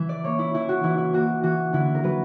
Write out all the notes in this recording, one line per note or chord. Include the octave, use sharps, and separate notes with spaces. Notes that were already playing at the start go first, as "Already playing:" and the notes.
Already playing: E3 E5
D5
A#3 C#5
E4
E3 E4
F#4
E3 E4
E4
A#3 F#4
E3 F#4
D3 E4
A#4
F#3 B4